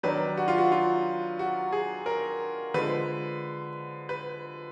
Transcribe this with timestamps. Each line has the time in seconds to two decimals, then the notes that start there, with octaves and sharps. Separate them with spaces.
0.03 D#3 F#3 D4 B4
0.37 F#4
0.48 F4
0.58 F#4
0.72 F4
1.39 F#4
1.72 G#4
2.06 A#4
2.74 D3 F3 G#3 B4
4.09 B4